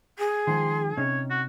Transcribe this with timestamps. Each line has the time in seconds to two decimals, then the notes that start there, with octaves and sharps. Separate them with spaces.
0.18 G#4
0.47 D#3 F3 G#3 C6
0.97 C3 C#4 D#4 C#5
1.31 F#4